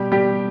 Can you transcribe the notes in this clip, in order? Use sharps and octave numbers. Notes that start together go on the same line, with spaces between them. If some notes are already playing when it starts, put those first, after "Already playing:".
Already playing: B2 G3 G4
G3 G4